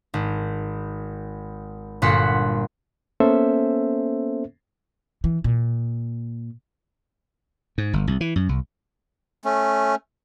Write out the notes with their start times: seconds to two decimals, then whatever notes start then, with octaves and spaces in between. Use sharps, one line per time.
0.14 G#1
2.02 G1 A#2 F#4 F#5 C6 B6
3.20 A#3 B3 C#4 A4 C5 E5
5.24 E3
5.44 A#2
7.78 G#2
7.93 G1
8.07 C2
8.21 E3
8.36 F#2
8.49 C2
9.45 A3 C#4